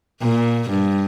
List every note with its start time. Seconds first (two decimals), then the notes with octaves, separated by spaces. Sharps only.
0.22 A#2
0.70 G2